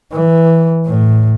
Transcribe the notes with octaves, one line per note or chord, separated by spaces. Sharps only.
E3
A2